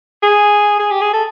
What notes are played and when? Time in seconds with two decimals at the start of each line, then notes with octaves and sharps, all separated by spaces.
0.23 G#4
0.79 G#4
0.91 G4
1.01 G#4
1.13 A4